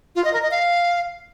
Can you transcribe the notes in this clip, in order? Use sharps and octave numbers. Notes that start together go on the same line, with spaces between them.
F4
D#5
A#4
D#5
F5